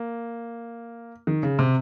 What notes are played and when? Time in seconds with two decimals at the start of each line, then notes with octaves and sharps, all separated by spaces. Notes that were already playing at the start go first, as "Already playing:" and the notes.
Already playing: A#3
1.27 D#3
1.43 C#3
1.59 C3